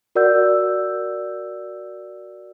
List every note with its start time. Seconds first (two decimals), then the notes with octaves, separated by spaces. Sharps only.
0.15 F#4 A#4 D5 F#5 E6 G6